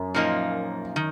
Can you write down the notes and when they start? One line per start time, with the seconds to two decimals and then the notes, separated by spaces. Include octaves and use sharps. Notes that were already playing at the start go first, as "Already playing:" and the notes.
Already playing: F#2
0.14 A#2 F3 A#3 D#4
0.96 D#3